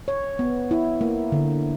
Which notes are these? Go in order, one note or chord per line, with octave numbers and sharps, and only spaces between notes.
C#5
B3
E4
A#3
D3